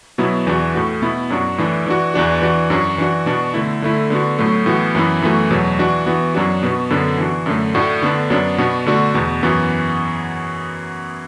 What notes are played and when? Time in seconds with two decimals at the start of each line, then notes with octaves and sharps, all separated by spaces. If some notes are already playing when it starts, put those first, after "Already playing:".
0.18 B2 F#3 B3 E4
0.47 E2 E3 D4 F#4
0.75 A2 A3 F#4
1.02 B2 B3 E4
1.30 F#2 F#3 D4 F#4
1.58 A2 E3 D4
1.86 E3 D4 F#4
2.14 E2 E3 D4 F#4
2.42 E3 D4 F#4
2.70 F#2 F#3 D4 F#4
2.98 E3 D4 F#4
3.26 B2 B3 D4 F#4
3.54 D3 A3 E4
3.82 D3 A3 E4
4.10 D3 B3 D4 F#4
4.39 A2 F#3 A3
4.66 A2 E3 B3 F#4
4.95 F#2 E3 B3 E4
5.22 F#2 E3 A3 F#4
5.50 E2 B2 F#3
5.79 E3 D4 F#4
6.06 E3 B3 F#4
6.34 F#2 F#3 D4 F#4
6.63 B2 B3 F#4
6.90 F#2 D3 B3 D4
7.18 E3 D4 F#4
7.46 F#2 D3 A3
7.75 A2 A3 D4 F#4
8.02 D3 B3 D4
8.30 F#2 F#3 B3 D4
8.58 B2 B3 D4 F#4
8.86 D3 A3 D4 F#4
9.14 E2 B2 B3
9.43 F#2 E3 B3 F#4